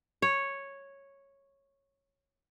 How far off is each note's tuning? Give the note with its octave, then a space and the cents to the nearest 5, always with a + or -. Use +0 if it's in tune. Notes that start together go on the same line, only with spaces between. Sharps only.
C#5 -5